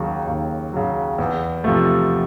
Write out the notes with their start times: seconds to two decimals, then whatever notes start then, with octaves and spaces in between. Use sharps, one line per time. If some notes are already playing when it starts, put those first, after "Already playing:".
Already playing: D#2 C#3 F#3
0.27 D#2
0.73 C#3 F#3
1.18 E2
1.64 C3 F3 A3